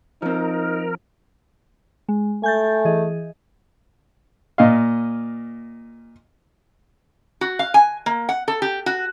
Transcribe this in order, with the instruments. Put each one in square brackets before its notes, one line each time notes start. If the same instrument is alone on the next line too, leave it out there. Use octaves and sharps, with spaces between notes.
[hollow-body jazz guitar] F3 C4 [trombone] D#4 [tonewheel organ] A#4
[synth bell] G#3
[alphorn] A3 [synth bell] G#5 G6 A6
[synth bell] E3 G#4 D#5
[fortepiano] A#2 D#5 F5
[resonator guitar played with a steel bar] F#4
F5
G#5
A#3
F#5
A4
G4
F#4